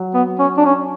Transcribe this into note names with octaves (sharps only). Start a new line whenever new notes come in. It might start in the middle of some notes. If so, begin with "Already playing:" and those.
Already playing: F#3
B3
C#4
D4
C#4